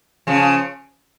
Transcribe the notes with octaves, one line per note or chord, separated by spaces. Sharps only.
C#3 F3